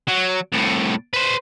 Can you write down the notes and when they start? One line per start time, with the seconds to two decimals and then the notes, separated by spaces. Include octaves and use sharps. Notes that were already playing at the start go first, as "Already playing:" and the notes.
0.08 F#3
0.53 C2 A2
1.14 B4 C5